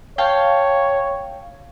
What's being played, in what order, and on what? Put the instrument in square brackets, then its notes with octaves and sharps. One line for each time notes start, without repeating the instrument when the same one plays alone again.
[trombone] C#5 [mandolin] F5 G5 A5